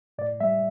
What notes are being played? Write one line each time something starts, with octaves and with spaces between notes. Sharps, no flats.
A2 D5
G3 E5